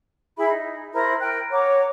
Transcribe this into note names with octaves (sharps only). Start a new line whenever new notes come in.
E4 G#4 E5 B5
D#4
E4 A#4 C5 A#5
A#4 G5 F#6
C#5 F#5 A#5 D6